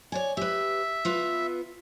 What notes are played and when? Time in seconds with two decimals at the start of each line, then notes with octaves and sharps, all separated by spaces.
0.12 C#5 D5 G#5
0.37 G4 B4 E5
1.05 B3 F4 B4